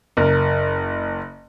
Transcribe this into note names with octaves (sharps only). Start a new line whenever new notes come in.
F#1 A#4